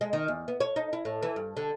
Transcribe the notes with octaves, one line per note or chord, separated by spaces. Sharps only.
G#3
D#3
E2
B3
C#5
D#4
E4
A2
E3
G2
D3